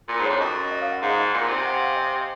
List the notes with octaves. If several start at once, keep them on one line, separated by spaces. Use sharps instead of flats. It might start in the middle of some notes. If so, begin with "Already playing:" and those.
A#2
G#2
F2 C#5
F#2 D#5
D#5
F5
F#5
G#2 F5
D#5
F5
A#2
C3
G#5
F#5
F5
D#5